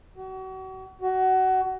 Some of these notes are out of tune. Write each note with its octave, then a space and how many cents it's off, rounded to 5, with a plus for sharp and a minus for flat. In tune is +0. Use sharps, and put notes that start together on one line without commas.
F#4 +35
F#4 +20